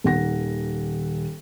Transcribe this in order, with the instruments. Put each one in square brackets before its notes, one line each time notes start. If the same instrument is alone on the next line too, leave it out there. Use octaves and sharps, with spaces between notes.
[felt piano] D#1 D#3 F#5 A#6